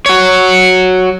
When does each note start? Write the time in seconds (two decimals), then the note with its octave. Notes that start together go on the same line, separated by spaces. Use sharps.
0.06 F#4 C#5